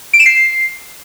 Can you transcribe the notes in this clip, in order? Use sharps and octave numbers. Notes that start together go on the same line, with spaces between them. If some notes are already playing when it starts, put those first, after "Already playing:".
D7
E7
C7